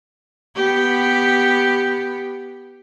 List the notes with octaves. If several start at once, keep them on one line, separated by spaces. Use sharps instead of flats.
B3 G4